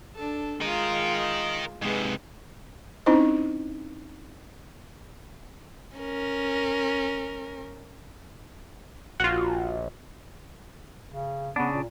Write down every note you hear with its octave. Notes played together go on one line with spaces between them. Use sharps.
D4 A4
G#3 F4 A#4 D#5
G#2 C3 G#3 B4
C4 C#4 D#4 E4 C5 D#5
C#4 A#4
A#1 F4 F#4
C#3
C#3 B3 D4
A#2